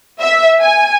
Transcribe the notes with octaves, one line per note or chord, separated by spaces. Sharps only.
E5
G#5